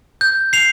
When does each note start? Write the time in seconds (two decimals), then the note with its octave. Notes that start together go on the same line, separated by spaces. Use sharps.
0.21 G6
0.53 C7 F7